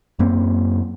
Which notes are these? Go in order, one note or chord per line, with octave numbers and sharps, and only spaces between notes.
F#2 A#3 C4